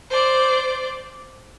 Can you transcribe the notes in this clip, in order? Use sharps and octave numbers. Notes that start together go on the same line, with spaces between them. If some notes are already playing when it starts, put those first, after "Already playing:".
C5 D5